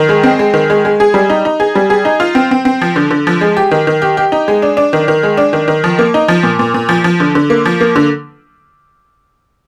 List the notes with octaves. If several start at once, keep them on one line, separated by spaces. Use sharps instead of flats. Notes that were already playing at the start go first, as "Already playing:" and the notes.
Already playing: D#3
G#3
C4
G#3
D#3
G#3
G#3
G#4
G3
D#4
D#4
G#4
G3
G#4
D#4
F4
C4
C4
C4
F3
D3
D3
F3
G#3
G4
D#3
D#3
G4
G4
D#4
G#3
D4
D4
D#3
D#3
G#3
D4
D#3
D#3
F3
A#3
D#4
F3
A#2
A#2
A#2
F3
F3
D3
D3
A#3
F3
A#3
D3